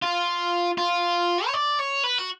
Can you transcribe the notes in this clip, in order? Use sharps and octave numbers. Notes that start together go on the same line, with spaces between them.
F4
F4
C#5
D5
C#5
B4
F#4